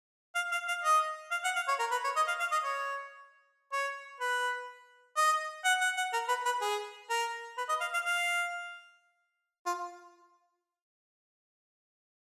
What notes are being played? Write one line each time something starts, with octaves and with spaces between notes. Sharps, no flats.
F5
F5
F5
D#5
F5
F#5
F5
C#5
A#4
B4
C#5
D#5
F5
F5
D#5
C#5
C#5
B4
D#5
F#5
F#5
F#5
A#4
B4
B4
G#4
A#4
B4
D#5
F5
F5
F5
F4